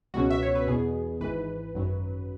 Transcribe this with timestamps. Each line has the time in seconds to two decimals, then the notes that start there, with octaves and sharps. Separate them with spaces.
0.14 C#2 B2 F#3 C#4 F#4
0.30 E5
0.43 C#5
0.55 B4
0.67 E2 B2 B3 G#4
1.20 G#1 G#2 E3 B4
1.74 G#1 F#2 F#3